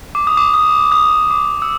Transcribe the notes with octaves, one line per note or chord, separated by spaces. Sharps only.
D6
D#6
D6
D#6
D#6
D6
E6